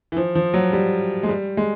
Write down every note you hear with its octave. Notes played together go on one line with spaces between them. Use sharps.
E3
F3
F3
F#3
G3
G#3
G3
G#3